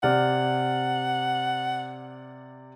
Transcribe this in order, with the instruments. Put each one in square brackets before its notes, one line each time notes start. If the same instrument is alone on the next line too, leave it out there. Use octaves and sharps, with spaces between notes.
[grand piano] C3 D5 F6 [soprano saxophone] F#5